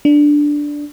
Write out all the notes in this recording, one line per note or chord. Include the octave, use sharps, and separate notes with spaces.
D4